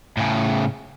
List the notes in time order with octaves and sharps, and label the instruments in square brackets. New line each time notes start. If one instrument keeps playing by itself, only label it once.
[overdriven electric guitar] A2 C#3